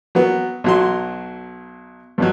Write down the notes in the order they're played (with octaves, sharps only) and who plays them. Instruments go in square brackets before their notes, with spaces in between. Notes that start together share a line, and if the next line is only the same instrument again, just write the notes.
[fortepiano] F#3 B3
B1 F#3 C6
G2 B2 F#3